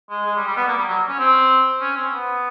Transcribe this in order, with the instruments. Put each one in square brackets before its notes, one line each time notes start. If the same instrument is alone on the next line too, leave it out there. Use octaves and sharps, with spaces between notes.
[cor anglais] G#3
G#3
G3
G3
B3
A#3
G3
F#3
C#4
C4
C#4
C4
B3